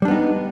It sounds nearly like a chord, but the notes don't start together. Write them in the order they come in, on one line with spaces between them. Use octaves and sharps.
G3 D4 B3 D#4